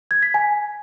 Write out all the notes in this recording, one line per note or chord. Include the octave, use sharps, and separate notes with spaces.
G#6
B6
G#5